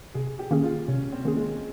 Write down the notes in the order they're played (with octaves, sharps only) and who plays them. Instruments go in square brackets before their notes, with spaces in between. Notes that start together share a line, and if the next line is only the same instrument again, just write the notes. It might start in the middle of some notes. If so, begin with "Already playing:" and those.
[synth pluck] C3 [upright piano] G#4
[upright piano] G4
[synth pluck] D#3 A#3 C#4 G#4
[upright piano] F4
[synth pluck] C3 [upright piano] C#4
[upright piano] C4
[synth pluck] D#3 A#3 C#4 G#4
[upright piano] G#3